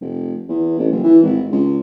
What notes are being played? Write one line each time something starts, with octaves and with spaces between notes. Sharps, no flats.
F1
E2
A1
F#1
E3
G#1
C#2